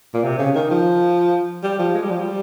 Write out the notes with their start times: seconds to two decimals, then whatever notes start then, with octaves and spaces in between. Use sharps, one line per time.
0.14 A#2
0.24 C3
0.39 C#3
0.55 D#3
0.70 F3
1.63 G3
1.79 F3
1.94 G#3
2.02 G3
2.11 F3
2.19 G3